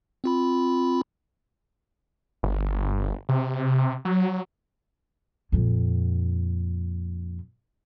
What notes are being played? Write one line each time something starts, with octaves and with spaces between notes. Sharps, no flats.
C4 F4 B5
G1
C3
F#3
F2 A#2